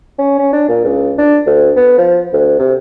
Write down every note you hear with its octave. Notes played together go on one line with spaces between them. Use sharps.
C#4
C#4
D4
A#2
C#2
D4
D2
B3
F3
D2
C3